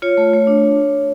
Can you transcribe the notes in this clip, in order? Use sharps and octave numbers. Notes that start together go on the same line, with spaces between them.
F4 C#5
A3
A3
D4